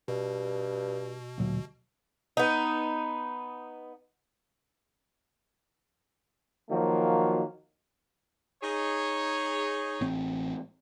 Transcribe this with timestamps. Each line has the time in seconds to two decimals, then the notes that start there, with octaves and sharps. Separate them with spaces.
0.08 G2 B2
1.38 D2 A#2 F#3
2.37 B3 D#4
6.70 D#3 F3 F#3 A#3 F#4
8.63 D#4 G#4 C#5
10.01 A1 C4